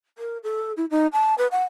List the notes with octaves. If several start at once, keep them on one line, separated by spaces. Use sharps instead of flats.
A#4
A4
E4
D#4
A5
B4
F#5